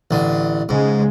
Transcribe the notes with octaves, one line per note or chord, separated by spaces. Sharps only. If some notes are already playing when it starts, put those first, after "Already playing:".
A1 D3
G#2 C#3 G#3